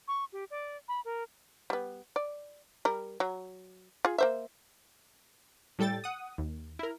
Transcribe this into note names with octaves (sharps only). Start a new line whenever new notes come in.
C#6
G4
D5
B5
A#4
G3 B3
D5
G3 A#4
F#3
F4 G#4
A#3 C5 E5
A2 G3 A4 G5 A6
F#5 D#6
D#2
E4 A#4